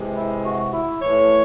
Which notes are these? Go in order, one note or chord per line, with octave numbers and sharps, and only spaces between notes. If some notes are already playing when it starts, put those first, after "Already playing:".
Already playing: C3 E3 G#3
E4
F#4
E4
A2 E3 A3 C#5